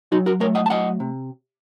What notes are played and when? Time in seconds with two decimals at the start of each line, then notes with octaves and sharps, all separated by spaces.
0.12 F#3 D#4 F#4
0.26 F#4 A#4
0.40 A3 A#4 C#5
0.55 D#5 F#5
0.66 A5
0.70 F#3 D#5 F#5
1.00 C3